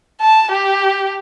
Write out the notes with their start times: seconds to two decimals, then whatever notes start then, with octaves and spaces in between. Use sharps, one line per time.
0.21 A5
0.51 G4